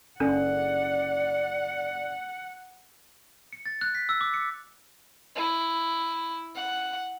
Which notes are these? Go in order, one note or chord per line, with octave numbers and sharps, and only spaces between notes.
F#1 C#4 D4 A4 D5 F#5
C#7
A6
F#6
B6
E6
D6
C#7
E4
F#5